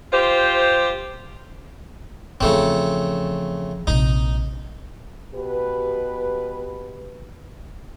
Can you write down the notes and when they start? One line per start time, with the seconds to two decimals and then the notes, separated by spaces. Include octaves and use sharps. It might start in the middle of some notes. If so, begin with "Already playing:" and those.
0.13 F4 G4 C5
2.41 E2 C#3 F3 A3 C4
3.87 A#1 C3 D#4
5.34 B2 G4 B4